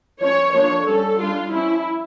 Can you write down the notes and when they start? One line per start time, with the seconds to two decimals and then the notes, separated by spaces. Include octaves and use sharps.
0.20 F3 C#4 C#5
0.53 F3 A#3 D4 C#5
0.86 G3 C#4 A4
1.19 G3 D4 F4
1.52 F3 C#4 E4